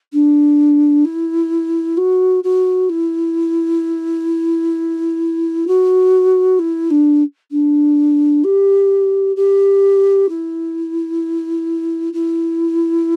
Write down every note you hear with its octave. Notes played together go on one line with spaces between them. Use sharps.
D4
E4
F#4
F#4
E4
F#4
E4
D4
D4
G4
G4
E4
E4